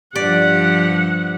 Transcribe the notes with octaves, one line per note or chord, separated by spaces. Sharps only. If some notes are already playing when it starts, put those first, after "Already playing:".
G2 F3 G4 D5 F#5